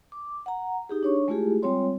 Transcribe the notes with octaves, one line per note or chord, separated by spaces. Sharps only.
D6
F#5 A#5
D#4 G4 G#4
D4 C#5 C#6
G#3 A3 E4 F4 G4 G#4
G3 G#3 C4 F4 C#5 C6